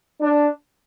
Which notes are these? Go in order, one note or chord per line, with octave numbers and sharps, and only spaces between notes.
D4